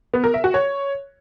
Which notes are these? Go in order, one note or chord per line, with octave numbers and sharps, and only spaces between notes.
B3
A#4
E5
F#4
C#5